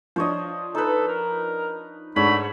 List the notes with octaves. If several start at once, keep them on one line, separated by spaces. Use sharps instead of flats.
F3 D4 C5 C#5 D#5
D#4 A4 B4
A#4
G#2 A3 D4 C#5 F#5 B5